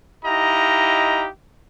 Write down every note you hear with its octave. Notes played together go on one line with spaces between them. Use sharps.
D#4 E4 G4 D#5 F5 A#5